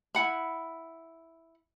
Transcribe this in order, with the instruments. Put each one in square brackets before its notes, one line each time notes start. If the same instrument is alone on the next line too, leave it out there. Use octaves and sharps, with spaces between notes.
[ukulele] E4 F#5 B5